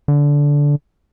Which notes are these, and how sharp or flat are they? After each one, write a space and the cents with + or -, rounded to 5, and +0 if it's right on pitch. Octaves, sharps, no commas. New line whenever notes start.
D3 -15